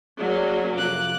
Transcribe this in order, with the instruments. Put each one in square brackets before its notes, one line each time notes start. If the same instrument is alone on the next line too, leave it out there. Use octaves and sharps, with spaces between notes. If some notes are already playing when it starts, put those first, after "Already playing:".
[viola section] F#3 A#3 C#4 [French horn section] G#4 D5
[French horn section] F2 C3 F4 [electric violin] D6 F#6